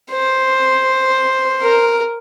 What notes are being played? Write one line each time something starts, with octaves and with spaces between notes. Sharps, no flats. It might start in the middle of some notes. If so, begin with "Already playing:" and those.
C5
A#4